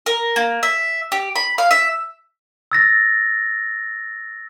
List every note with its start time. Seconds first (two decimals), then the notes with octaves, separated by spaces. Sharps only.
0.06 A#4
0.36 A#3
0.63 E5
1.12 G4
1.36 B5
1.58 F5
1.71 E5
2.72 E6 A6 A#6